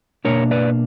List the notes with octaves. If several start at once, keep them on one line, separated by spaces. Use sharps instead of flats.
B2 A#3 D4 A#4 C#5
B4 D5